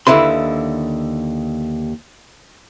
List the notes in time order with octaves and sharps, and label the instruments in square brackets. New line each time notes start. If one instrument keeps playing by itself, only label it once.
[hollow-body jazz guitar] D#2 G#2 D3 E4 B4 C6